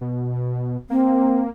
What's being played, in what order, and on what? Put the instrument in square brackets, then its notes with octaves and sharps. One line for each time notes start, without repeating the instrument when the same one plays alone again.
[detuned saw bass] B2
[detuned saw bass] A#3 [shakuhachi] C4